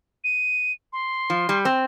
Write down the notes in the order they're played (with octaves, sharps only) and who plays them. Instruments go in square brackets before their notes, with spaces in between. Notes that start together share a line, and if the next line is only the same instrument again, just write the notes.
[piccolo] D#7
C6
[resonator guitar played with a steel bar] F3
G3
C4